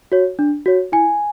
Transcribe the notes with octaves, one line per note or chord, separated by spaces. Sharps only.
F#4 C#5
D4
F#4 C#5
E4 G#5